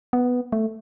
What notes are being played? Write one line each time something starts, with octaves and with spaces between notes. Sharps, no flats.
B3
A3